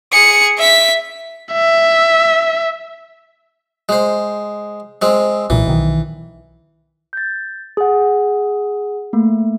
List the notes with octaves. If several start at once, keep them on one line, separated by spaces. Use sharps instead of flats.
G#4 C#7
E5 B6
E5
G#3 C5
G#3 C4
B1 A#2 E3
B1 D#3
G6 A6
G#4 F#5
A3 A#3